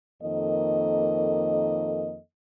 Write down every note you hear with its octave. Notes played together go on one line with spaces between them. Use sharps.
F2 D#3 A#3 A4 D#5